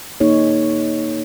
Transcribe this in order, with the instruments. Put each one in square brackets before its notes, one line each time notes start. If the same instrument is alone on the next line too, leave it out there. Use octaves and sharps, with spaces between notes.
[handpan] A#3 D#4 G#4 C#5